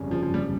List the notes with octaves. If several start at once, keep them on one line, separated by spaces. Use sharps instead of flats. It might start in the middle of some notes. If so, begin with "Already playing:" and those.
Already playing: G1 F2 C#3 G3 C#4
F3
F3
G3